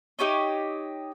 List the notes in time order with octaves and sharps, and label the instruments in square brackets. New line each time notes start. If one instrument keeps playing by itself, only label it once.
[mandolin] D#4 G4 C#5 D#5